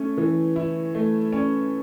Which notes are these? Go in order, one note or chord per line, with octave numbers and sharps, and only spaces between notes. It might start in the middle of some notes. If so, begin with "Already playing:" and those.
Already playing: A3 C#4
E3
E4
A3
C#4